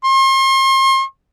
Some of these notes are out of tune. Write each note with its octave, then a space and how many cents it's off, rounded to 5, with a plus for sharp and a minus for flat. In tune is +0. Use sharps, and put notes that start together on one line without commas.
C6 +40